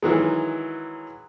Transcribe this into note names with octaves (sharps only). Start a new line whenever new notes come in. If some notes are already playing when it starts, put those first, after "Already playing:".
D#3 E3 F#3 G#3